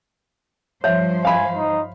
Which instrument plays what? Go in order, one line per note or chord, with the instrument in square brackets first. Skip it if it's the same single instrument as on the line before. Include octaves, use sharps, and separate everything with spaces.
[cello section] G2 F3 C5 [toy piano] C#5 E5
[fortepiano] F5 B5 [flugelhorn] G#5
[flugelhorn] D#4